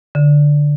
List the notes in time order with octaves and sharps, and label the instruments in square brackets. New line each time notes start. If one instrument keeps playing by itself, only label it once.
[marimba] D3